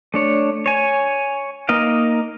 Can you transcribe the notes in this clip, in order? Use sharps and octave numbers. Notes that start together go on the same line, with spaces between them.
A3 D4 C#5
C#5 G#5
A#3 D#4 D#5 F5